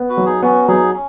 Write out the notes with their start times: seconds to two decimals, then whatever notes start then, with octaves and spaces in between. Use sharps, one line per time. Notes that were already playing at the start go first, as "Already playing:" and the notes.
Already playing: B3
0.09 F#4 B4
0.17 F#3
0.26 D#4 G#4
0.42 B3 C#4 F#4
0.68 F#3 D#4 G#4
0.93 C#4